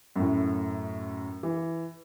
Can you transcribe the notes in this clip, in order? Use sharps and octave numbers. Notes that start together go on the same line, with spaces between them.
F#2 A2
E3